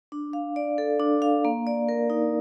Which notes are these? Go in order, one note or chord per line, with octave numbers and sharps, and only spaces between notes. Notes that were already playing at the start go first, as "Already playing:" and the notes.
D4
F5
D5
A4
D4
F5
A#3
D5
A#4
D#4